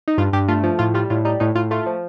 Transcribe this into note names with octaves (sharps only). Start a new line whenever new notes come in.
D#4
G2 F4
G2 G4
A3 F4
F3
A2 F4
G3 F4
A2 F4
G3 D#4
A2 D#4
A2 F4
A3 F4
F3